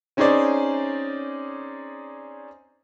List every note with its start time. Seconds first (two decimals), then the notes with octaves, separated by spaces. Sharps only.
0.17 C4 C#4 D#4 G#4 C5 D5